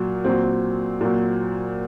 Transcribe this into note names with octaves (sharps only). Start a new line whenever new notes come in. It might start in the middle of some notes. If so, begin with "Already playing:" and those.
Already playing: A#2 F#3
A#2 F#3 C4
A#2 F#3